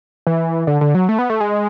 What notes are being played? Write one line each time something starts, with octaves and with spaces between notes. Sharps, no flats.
E3
D3
D3
F#3
A3
B3
A3
G#3